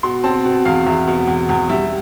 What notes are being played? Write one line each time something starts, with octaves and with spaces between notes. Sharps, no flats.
B2 C6
C4 A5
B2
E2 F5
E2 E5
B2
E2
E2
G3 E5